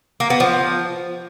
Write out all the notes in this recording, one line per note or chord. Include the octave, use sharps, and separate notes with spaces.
A#3
B3
F3